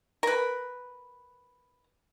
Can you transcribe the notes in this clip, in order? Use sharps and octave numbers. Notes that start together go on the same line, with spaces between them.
A#4 B4